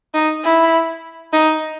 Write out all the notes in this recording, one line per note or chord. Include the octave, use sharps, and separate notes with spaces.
D#4
E4
D#4